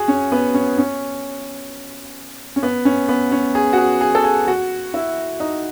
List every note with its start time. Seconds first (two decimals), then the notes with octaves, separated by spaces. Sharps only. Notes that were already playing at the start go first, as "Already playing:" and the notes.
Already playing: F#4 G#4
0.08 C#4
0.32 B3
0.54 C#4
0.78 C#4
2.56 C#4
2.63 B3
2.85 C#4
3.09 B3
3.32 C#4
3.55 G#4
3.73 F#4
3.78 G#4
4.01 G#4
4.15 A4
4.24 G#4
4.48 F#4
4.94 E4
5.40 D#4